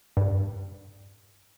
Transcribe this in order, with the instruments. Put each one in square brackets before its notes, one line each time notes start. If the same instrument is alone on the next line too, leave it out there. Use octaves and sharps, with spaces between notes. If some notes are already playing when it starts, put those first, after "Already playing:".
[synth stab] G2